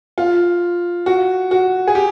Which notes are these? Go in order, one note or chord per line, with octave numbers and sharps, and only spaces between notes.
F4
F#4
F#4
G#4
G4